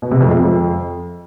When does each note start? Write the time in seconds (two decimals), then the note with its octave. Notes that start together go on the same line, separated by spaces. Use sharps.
0.02 B2
0.11 C3
0.20 F2
0.30 G#3
0.39 F2